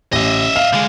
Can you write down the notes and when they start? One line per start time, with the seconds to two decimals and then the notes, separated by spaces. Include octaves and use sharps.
0.13 A1 D#5 E5
0.56 F5
0.73 D3 G#3